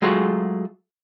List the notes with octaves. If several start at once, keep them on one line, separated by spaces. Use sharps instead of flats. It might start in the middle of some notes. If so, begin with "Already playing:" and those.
F#3 G#3 A3 F4 F#4 G#4